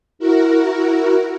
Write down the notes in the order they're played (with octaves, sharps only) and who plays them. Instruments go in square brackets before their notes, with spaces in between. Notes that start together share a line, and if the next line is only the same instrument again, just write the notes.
[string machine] E4 F#4 A#4